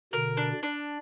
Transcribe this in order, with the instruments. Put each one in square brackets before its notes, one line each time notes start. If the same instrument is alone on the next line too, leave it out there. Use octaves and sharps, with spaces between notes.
[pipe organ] B2 D3 [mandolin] A#4
[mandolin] D4
D4